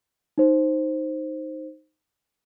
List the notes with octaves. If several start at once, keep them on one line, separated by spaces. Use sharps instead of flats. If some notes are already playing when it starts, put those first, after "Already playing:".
D#4 C5